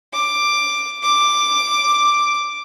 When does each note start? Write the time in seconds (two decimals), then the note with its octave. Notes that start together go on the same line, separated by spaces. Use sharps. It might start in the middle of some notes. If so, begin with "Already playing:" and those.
0.13 D6
1.03 D6